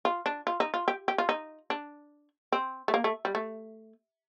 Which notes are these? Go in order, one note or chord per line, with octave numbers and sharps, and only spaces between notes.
F4
D4
F4
D#4
F4
G4
G4
F4
D#4
D4
C4
A3
A#3
A3
G3
A3